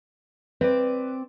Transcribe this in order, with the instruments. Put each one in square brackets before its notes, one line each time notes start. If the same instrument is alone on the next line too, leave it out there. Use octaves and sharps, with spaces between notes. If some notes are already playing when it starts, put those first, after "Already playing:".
[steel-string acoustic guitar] C4 D5 [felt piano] B4